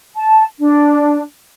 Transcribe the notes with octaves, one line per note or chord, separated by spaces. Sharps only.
A5
D4